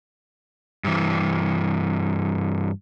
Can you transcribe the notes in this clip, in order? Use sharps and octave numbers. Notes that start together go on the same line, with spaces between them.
G2 E3